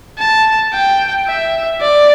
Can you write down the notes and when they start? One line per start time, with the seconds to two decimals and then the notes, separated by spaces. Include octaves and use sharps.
0.19 A5
0.73 G5
1.27 E5
1.81 D5